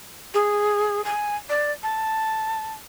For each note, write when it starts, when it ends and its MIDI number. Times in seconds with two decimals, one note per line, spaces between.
0.34 1.04 68
1.05 1.35 80
1.49 1.72 74
1.83 2.74 81